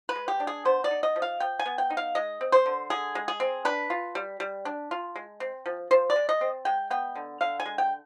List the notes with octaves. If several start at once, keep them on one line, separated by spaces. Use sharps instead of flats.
B4
G#3
G4
D4
G#4
B3 C5
D5
D#4
D#5
F3
F5
F3 G5
G#5
B3
G5
D#4
F5
G#3 D#5
C4
C5
D3
D3 G#4
G#3
G#4
C4
D4 B4
F4
G3
G3
D4
F4
G#3
C4
F3
F3 C5
D5
G#3
D#5
C4
G#3 G5
B3 G5
D3
D3 F5
G#5
G#3
G5